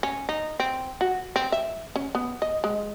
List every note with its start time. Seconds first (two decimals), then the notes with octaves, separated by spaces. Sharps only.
0.03 C#4
0.29 D#4
0.60 C4
1.01 F#4
1.36 C4
1.52 E5
1.96 C#4
2.15 B3
2.42 D#5
2.64 G#3